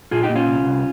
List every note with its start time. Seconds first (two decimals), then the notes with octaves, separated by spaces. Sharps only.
0.11 A#2 F4 G#4
0.23 D#4 G4
0.29 A#2
0.35 C#4 F4
0.47 C2
0.66 C2